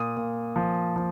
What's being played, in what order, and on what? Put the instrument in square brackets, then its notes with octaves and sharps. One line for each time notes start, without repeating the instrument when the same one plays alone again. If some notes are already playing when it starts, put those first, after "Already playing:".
Already playing: [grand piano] A#2 D#6
A#2
F3
F3